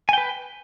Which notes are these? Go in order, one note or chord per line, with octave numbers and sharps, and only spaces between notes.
B4 G5 G#5